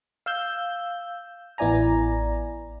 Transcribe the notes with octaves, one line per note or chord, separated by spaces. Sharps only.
F5 E6 G6
A1 B3 E4 D5 G#5 A#5